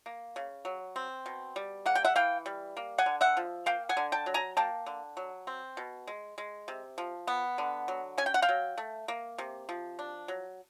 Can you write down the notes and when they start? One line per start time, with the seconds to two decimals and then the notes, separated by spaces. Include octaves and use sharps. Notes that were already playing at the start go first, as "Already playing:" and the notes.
0.06 A#3
0.36 C#3
0.65 F#3
0.96 C4
1.26 B2
1.56 G3
1.86 A#3 F#5
1.95 G5
2.05 E5 F#5
2.16 E3 F5 G5
2.46 G3
2.77 A#3
2.98 F#5 G#5
3.06 D3
3.21 E5 F#5
3.37 F3
3.66 A#3 F5 G5
3.89 F#5 G#5
3.97 D3
4.12 G5 A5
4.26 F#3
4.34 G#5 A#5
4.57 A#3 G5 A5
4.86 D3
5.17 F#3
5.47 C4
5.77 B2
6.07 G#3
6.38 G#3
6.68 C3
6.98 F3
7.27 B3
7.58 D3
7.88 F#3
8.18 C#4 G#5
8.26 G5
8.34 F#5
8.42 F5 G5
8.49 F#3
8.78 A3
9.08 A#3
9.38 C3
9.69 F3
9.99 D4
10.28 F#3